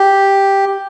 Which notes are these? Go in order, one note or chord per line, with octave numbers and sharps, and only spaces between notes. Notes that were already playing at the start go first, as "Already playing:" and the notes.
Already playing: G4